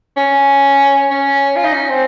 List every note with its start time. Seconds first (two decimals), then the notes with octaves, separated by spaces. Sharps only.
0.17 C#4
1.11 C#4
1.56 F4
1.64 D#4
1.73 C#4
1.89 C4